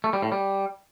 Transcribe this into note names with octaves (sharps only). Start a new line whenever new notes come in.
A3
G3
A2
G3